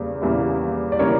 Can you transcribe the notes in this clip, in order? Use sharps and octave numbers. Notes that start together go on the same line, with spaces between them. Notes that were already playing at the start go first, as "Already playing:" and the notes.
Already playing: E2 C#3 G3 A#3
E2 C#3 G3 A#3 E4
D5
C#3 G3 A#3 E4 A#4 C#5